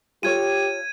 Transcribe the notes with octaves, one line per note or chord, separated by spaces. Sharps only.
F4 G4 A4 C#5 G#6 D#7